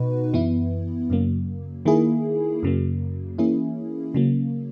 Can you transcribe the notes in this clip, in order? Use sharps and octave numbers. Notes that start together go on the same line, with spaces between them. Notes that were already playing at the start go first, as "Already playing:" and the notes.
Already playing: B2 D#4 F#4 B4
F#2 E3 B3 E4
F#2 C#3 F#3 A#3
D#3 A#3 E4 G#4
F#2 C#3 F#3 A#3
E3 A#3 C#4 E4 G#4
C#3 F#3 A#3